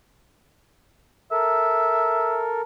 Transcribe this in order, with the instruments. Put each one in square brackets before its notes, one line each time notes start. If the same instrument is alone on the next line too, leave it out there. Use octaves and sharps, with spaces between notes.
[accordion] A4 A#4 [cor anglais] E5